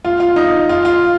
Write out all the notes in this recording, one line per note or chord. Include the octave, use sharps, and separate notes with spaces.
F4
F4
D#4
F4
F4